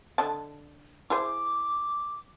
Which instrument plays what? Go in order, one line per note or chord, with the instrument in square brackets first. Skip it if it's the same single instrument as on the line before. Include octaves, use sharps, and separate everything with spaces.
[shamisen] D3 D#5 A5
[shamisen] E4 G#4 C5 [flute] D6